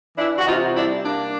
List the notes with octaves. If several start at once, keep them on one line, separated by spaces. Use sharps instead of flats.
E3 D4 E4
F#4
C3 D#4 F4
G3 D4 E4
A#3 D4